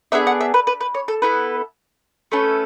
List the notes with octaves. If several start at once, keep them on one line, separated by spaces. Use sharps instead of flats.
B3 D4 G#4 E5
F#5
E5
B4
B4
B4
C#5
A4
B3 E4 A4 B4
A3 C#4 E4 A4 B4